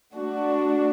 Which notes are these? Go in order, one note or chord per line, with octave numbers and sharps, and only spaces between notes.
A3 D4 F#4